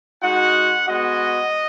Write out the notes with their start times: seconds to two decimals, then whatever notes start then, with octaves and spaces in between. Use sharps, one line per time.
0.21 G#3 D#4 F#4 F#5
0.87 G#3 B3 F#4 D#5